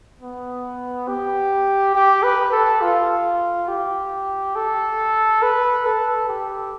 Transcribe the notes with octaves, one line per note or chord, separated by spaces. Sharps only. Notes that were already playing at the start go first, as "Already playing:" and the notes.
B3
G4
G4
B4
A4
F4
G4
A4
B4
A4
G4